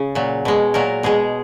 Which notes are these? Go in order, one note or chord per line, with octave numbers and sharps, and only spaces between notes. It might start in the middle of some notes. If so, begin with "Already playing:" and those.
Already playing: C#3
A#2 F#3
B2 G#3
A#2 F#3 A#4
B2 G#3 G#4